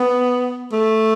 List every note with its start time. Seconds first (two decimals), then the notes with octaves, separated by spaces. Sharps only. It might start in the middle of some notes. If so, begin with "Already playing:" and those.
Already playing: B3
0.72 A3